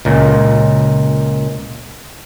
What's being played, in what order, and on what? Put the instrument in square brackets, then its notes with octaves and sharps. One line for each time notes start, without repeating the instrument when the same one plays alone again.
[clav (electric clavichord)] C#2 A#2